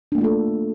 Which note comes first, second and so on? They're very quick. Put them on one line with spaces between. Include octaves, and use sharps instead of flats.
D4 A#3 A3 F4 A4